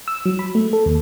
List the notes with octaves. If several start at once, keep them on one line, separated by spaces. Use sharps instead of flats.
E6
F#3
B5
A3
A4
D#2